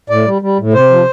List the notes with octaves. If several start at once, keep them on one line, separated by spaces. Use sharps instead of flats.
A2 D5
G3
G3
A2
C3 C5
F3